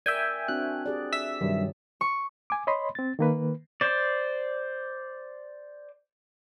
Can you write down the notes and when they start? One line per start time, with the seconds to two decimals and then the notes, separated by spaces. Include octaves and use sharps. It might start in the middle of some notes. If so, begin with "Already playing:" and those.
0.06 A#4 D5 E5 G5 G#5
0.48 C4 D4 F#4 F#6
0.86 G4 G#4 D5
1.13 E5 E6 B6
1.41 G2 C3 D#3 F#3 G3
2.01 C#6
2.50 G#5 D6
2.67 C#5 D#5 B5 C6
2.95 C4 A6
3.19 D#3 A#3 B4
3.81 C5 D5